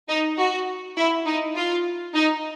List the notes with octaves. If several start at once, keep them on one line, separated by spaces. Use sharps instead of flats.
D#4
F#4
E4
D#4
F4
D#4